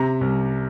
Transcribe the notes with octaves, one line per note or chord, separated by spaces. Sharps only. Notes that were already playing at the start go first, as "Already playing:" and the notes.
Already playing: C3 A#5
C2